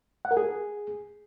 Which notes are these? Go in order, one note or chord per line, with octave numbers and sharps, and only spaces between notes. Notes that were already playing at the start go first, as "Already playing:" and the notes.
F#5
A#4
G#4